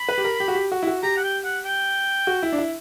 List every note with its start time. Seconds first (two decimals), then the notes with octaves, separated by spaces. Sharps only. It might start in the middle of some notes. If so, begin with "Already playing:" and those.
Already playing: B5
0.09 B4
0.18 G4
0.24 A#4
0.40 G4
0.48 F#4
0.55 G4
0.72 F#4
0.83 E4
0.87 F#4
1.03 G4 A#5
1.17 F#5
1.23 G5
1.44 F#5
1.65 G5
2.27 F#4
2.43 E4
2.52 D4
2.58 E4